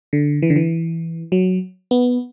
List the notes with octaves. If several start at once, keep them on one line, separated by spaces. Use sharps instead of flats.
D3
E3
D3
E3
F#3
B3